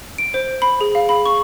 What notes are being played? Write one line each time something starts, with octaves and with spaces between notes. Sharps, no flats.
D7
C5
B5
G#4
F5
B5
C#6